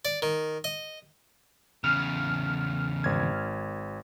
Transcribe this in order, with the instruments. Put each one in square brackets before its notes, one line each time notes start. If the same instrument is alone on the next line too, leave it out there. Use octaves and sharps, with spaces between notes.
[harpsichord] D5
D#3
D#5
[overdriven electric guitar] E2 C#3 [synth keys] F6
[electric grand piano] G#1 G#6